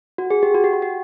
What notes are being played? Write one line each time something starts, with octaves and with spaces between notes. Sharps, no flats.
F#4
G#4
G4
F#4
G4
F#4
G4